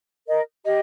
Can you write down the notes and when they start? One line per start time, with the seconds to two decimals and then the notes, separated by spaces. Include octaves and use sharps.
0.25 A#4 D#5
0.65 G4 D#5